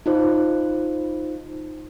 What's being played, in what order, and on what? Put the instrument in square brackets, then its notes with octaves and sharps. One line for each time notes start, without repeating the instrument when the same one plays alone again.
[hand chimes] D#4 F4 C5